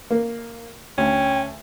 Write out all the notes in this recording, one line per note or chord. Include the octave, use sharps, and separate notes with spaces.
A#3
D2 C#4 G5